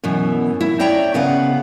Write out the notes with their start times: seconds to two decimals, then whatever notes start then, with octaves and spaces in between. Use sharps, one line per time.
0.04 F#2 B2 E3
0.61 E4
0.80 C#5 D5 E5 G5 A#5
1.14 C#3 B3 F5 F#5